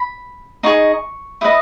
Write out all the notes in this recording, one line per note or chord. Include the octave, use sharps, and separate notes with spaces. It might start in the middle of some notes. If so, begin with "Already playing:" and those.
Already playing: B5
D#4 G#4 D#5 C#6
E4 B4 D#5 D#6